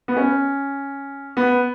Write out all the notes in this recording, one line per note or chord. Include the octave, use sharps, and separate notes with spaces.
B3
C#4
B3